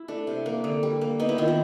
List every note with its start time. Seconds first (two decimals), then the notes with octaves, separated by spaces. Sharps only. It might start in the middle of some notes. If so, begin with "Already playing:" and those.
Already playing: E4
0.08 A3 D4
0.27 C3
0.46 A#3
0.64 D3
0.83 G3
1.01 A#3
1.20 B3 D#4
1.29 E4
1.38 D#3 F4
1.48 E4